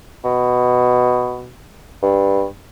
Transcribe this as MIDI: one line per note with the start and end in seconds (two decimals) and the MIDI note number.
0.24 1.53 47
2.02 2.45 43